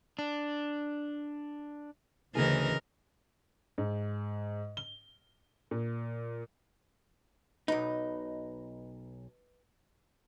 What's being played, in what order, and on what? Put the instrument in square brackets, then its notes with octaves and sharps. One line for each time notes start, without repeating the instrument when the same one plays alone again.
[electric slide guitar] D4
[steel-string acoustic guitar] D2 G#4 G#5 [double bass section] C#3 [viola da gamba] E3 A#4 D#5
[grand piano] G#2
G7
A#2
[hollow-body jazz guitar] B1 D#4 [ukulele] B4 D#5 B5